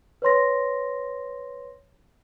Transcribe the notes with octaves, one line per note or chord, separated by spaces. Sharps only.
B4 C#5 C6 A#6